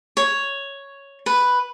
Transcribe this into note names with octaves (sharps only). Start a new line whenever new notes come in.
C#5
B4